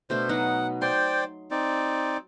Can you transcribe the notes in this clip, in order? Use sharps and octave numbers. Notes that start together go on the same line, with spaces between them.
B2 A3 D4 C5
F#3 B3 D#4 F#5
C5 D5 G5 C6
C4 D#4 D5